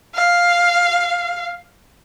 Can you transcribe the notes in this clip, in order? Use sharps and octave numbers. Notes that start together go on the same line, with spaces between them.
F5